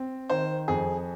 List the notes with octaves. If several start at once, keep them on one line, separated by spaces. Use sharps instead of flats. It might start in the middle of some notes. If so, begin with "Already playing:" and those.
Already playing: C4
D#3 C5
F2 G#4